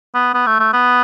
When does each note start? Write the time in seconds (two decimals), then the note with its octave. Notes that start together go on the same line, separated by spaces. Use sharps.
0.14 B3
0.34 B3
0.47 A3
0.60 A3
0.73 B3